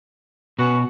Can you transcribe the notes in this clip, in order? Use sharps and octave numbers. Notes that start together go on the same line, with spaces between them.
B2 C#4 F#4 B4